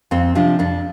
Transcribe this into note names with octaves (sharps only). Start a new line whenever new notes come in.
F2 C4
C3 F3 D4
F2 D4